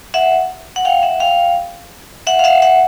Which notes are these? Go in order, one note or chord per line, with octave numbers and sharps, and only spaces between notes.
E5 F#5
F#5
F5 G5
E5 F#5
F5 G5
E5 F#5
F5
E5 F#5
E5 F#5